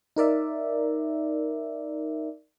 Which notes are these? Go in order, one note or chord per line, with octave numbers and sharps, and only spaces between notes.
D#4 A#4 D5 E5